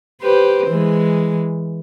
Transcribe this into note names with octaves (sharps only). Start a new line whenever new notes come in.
G4 B4 C5
E3 G#3